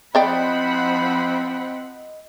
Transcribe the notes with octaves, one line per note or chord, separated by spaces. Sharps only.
F3 C4 C5 D5 D#5 F#5 G5 B5